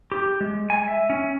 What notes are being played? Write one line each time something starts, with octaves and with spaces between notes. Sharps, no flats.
G4
G#3
G#5
E5
C#4